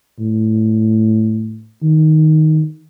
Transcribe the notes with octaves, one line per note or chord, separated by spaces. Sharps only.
A2
D#3